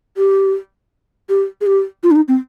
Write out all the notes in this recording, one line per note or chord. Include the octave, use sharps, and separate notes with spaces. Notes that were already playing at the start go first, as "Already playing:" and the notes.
G4
G4
G#4
G4
F4
D4
D#4
C4